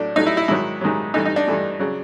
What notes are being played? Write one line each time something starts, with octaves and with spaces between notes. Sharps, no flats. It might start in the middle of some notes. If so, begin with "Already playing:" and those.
Already playing: A2 F#3 A3 D4
A2 F#3 A3 D#4
E4
E4
G#2 D#3 F#3 E4
G#2 D#3 F#3
G2 E3 A3 D#4
D#4
D4
G2 E3 A3
C#3 F#3